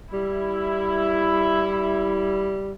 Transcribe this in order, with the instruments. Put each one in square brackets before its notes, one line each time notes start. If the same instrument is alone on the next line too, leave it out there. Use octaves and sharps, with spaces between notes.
[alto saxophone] G3 [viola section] E4